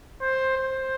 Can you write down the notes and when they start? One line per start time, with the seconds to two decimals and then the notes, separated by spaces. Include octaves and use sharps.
0.21 C5
0.57 C5